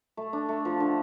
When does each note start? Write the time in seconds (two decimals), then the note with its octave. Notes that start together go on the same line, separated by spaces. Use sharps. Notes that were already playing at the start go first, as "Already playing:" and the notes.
0.17 A3
0.33 D4
0.49 A3
0.65 F3
0.80 D3